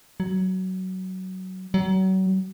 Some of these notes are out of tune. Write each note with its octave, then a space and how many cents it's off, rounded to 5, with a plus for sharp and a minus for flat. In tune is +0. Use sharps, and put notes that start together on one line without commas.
F#3 +15
F#3 +35